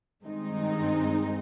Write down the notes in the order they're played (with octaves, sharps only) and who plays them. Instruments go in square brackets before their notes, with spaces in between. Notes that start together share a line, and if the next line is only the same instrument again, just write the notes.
[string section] G2 D#3 G#3 C4 D#4